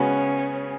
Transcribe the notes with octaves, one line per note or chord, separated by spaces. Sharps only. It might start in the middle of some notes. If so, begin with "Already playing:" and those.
Already playing: C#3 G#3 B3 C#4 F#4